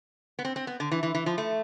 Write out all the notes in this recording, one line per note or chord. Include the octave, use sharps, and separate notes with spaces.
B3
C4
C4
B3
D3
E3
E3
E3
F3
A3